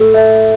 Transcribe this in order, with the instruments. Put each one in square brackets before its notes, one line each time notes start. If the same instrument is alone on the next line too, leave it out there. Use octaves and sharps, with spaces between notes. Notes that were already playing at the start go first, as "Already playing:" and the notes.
Already playing: [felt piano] A2 A3 [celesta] A4
[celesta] E5